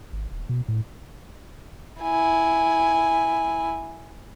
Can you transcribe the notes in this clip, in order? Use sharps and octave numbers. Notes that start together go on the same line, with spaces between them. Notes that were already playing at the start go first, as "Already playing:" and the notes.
G#1
D#1
B2
A2
E4 G#5